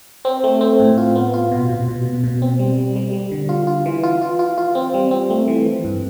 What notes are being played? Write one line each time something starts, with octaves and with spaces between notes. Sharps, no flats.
C4
A3
C4
A2
F4
B3
F4
B2
B2
B2
B2
B2
C4
G3
G3
G3
G3
D3
F4
F4
E3
F4
F4
F4
F4
C4
G3
C4
A3
E3
E3
G2